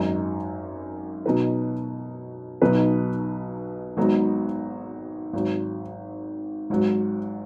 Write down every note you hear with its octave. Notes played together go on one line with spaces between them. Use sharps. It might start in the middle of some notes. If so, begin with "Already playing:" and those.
Already playing: G#1 F#2 F#3 D#4
B2 F#3 D#4 B4
B1 B2 F#3 D#4 B4
G#1 G#2 F#3 B3 D#4
G#1 G#2 F#3
G#1 G#2 F#3